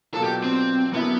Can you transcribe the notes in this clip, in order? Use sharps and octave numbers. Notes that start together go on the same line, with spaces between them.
B2 F#3 A#3 D4 F4 A4
G4
C4
D3 F#3 A#3 B3 C#4 E4